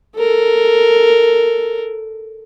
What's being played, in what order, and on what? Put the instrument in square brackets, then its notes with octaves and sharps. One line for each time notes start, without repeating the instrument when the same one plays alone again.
[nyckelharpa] A4 A#4